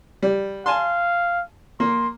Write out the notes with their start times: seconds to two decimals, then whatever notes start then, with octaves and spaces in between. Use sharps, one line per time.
0.23 G3
0.66 F5 G#5 A5 C6
1.80 A#3 C6